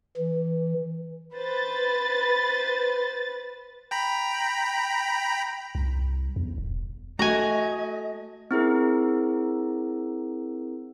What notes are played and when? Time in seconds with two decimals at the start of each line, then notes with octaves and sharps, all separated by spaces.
0.17 E3
1.36 B4 C5 A6
3.91 G5 A#5 B5
5.75 C2
6.36 E2
6.58 D#1
7.19 A3 F#4 D#5 G#5 A#5
8.51 C4 E4 G#4 A#4